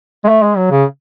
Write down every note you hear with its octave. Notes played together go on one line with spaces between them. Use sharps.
G#3
A3
G#3
F#3
C#3